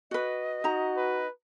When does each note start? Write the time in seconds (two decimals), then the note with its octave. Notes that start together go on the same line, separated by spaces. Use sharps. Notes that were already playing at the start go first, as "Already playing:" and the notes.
0.11 F#4 B4 D#5
0.64 D#4 F#4 A#5
0.97 B4